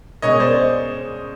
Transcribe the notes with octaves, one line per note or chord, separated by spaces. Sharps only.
B2 G#3 C#4 C#5 D#5
C5 D5